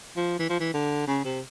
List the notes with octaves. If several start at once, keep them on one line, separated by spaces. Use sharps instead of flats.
F3
E3
F3
E3
D3
C#3
C3